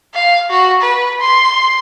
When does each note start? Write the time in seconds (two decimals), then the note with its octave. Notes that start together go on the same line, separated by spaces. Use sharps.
0.14 F5
0.50 F#4
0.81 B4
1.20 C6